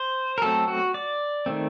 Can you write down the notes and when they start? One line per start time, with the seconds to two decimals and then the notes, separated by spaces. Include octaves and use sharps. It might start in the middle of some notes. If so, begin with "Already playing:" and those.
Already playing: C5
0.38 A#4
0.42 F#3 A3 C4 A4
0.68 F#4
0.94 D5
1.46 D#3 A3 C4